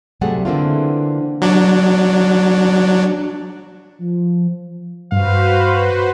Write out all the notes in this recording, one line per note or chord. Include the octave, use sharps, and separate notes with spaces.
C3 F#3 G3 A3 G#4 F#5
D3 E3 A#3 C4 D4 F4
F#3 D4
F3
G2 F#4 B4 C5 F5